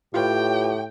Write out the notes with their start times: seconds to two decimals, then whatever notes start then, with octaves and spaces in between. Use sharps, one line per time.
0.14 A2 F4 G4 B4 C#5 G5